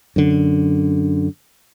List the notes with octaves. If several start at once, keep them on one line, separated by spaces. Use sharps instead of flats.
F#2 D3